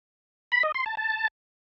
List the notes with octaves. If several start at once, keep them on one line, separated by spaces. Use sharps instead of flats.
B5
D#5
C6
A5
A5